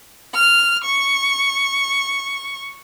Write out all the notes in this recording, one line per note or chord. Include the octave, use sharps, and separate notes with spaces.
F6
C#6